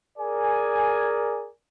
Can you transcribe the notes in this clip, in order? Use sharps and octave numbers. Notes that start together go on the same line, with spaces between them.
G#4 A#4 D5 G#5